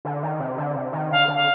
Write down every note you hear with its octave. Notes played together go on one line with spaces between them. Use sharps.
D3
D#3
C3
D3
C3
D#3
D3 F5
D3
F5